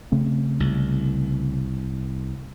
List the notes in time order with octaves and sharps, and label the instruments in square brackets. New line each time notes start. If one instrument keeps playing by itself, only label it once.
[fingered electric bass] C#3 A3 C4
[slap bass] C2